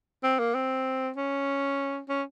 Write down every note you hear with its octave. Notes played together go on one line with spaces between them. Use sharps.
C4
A#3
C4
C#4
C#4